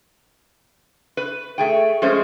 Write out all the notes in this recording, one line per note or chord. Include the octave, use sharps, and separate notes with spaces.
B4
A3 G#4 G5
F3 G#3 A3 C#4 C5